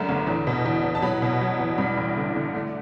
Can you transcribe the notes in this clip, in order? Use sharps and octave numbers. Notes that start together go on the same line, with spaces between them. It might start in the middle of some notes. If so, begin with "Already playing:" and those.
Already playing: F#2 D3 A3
G1
E2
B2
E2
E2
A5
F#3 B5
B2
F#3
E2
G2 B5
A1
D3
D3
A3